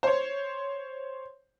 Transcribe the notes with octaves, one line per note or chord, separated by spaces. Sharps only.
C5 C#5